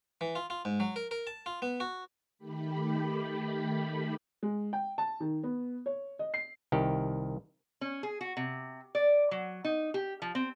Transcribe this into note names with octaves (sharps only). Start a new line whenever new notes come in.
E3
F4
F4
G#2
F#3
A#4
A#4
A5
F4
B3
F#4
D#3 A3 G4 B5
G#3
G5
A5
D#3
B3
C#5
D#5
C7
C2 D#3 G4
C#4
G#4
F#4
C3
D5
F#3
D#4
G4
F3
C4